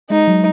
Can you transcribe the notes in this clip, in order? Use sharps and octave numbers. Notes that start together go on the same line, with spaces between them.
G#3 D#4
F#3